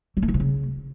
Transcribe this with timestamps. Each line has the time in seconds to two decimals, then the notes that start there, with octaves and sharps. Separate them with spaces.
0.17 F#3
0.22 A#3
0.28 D#3
0.34 C3
0.40 C#3